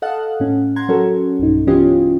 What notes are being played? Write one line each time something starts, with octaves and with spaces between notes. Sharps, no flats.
A4 D#5 F5 F#5 A5 F#6
A2 C#4
F#5 A#5 C6 G#6
F#3 C#4 F#4 A4 A#4
B1 G2 D#4
E3 B3 C#4 F4 G4 D#5